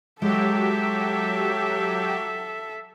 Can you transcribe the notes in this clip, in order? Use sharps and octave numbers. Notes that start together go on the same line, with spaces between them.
F#3 G#3 G4 A4 E5